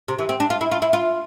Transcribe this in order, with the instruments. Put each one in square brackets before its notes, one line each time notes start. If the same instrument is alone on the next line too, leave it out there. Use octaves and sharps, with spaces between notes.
[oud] C3
E3
C4
D4
F4
E4
F4
E4
F4